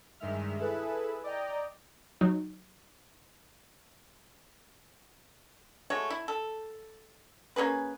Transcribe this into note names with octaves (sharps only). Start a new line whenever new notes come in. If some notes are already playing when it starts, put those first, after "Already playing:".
G2 D#3 G#3 E5 F6
E4 G#4 A4 B4 E5
D5 D#5 G5 A#5
F#3 D#4
G#3 A3 F#4 C#5
E4
A4
A#3 C#4 G#4 B4